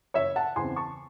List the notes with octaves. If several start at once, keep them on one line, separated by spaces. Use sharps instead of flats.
F#1 C#5 E5
F#5 A5
E2 C#3 E3 C4 G#5 C6
A5 C#6